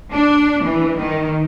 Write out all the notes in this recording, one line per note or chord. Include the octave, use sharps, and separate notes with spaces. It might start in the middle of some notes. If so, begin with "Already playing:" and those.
D4
E3
D#3